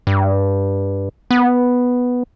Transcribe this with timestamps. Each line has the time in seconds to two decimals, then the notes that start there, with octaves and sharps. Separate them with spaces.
0.07 G2
1.31 B3